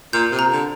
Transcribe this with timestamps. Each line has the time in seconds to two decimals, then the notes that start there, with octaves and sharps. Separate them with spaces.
0.13 A#2 G6
0.32 C3
0.39 A#5
0.51 D3